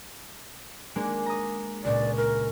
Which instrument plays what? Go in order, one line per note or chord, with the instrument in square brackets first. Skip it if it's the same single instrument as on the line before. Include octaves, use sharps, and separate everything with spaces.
[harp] G#3 A#3 D4
A#5 D#6
[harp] C#2 A#2 [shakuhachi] D5
[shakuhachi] A#4